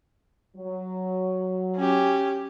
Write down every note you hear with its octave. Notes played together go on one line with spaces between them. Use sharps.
F#3
C#4 G4